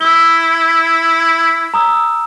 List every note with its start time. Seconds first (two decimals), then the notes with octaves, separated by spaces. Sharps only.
0.01 E4 E6 G7
1.74 A#5 D#6 E6